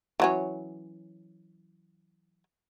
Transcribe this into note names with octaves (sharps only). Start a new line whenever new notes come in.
E3 F#3 C#4